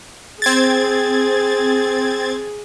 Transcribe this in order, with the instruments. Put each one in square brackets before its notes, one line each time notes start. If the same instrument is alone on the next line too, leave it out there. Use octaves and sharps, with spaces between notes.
[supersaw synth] C4 G#6 A6 [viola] G#4